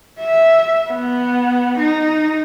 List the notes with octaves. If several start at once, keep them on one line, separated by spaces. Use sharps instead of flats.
E5
B3
D#4